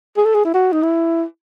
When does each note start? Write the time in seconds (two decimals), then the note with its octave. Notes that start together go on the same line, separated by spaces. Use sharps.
0.17 G#4
0.26 A4
0.35 G#4
0.45 E4
0.54 F#4
0.72 D#4
0.83 E4